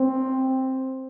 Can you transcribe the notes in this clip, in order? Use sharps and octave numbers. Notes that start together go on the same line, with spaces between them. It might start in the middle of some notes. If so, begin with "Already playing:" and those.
Already playing: C4